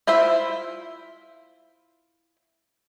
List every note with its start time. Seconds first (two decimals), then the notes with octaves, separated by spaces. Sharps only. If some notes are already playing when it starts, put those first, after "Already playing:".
0.07 E4 F4 C5 E5